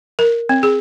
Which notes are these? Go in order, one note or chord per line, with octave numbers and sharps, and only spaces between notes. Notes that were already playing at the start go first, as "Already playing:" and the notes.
A#4
C4
G#4